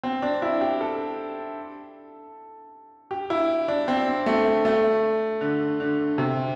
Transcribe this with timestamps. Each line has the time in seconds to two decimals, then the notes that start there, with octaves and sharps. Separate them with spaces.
0.03 C4
0.22 D4
0.42 E4
0.61 G4
0.81 A4
3.11 G4
3.30 E4
3.68 D4
3.88 C4
4.26 A3
4.65 A3
5.41 D3
5.80 D3
6.18 C3